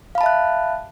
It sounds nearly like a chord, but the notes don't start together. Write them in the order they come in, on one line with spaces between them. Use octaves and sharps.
F5 B5 A5 E5 F#6